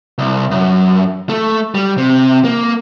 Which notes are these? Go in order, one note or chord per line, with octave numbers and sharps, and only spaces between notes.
C2
F#2
A3
G3
C3
A#3